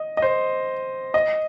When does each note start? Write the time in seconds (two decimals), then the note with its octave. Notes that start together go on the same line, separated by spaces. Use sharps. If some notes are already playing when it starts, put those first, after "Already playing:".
Already playing: D#5
0.17 D#5
0.22 C5
1.14 D#5